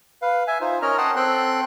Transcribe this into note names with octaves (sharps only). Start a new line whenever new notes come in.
B4 F5
E5 G#5
D#4 F4 C5
C#4 A#4 C#5 D#5 A#5 F6
D#5 F#5 G5 A5 C6 D#6
C4 A4 G5 C6 F#6